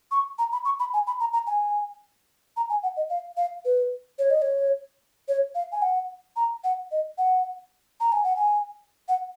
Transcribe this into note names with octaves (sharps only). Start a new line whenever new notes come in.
C#6
A#5
B5
C#6
B5
G#5
B5
A#5
A#5
G#5
A#5
G#5
F#5
D#5
F5
F5
B4
C#5
D#5
C#5
C#5
F5
G#5
F#5
A#5
F#5
D#5
F#5
A#5
G#5
F#5
G#5
F#5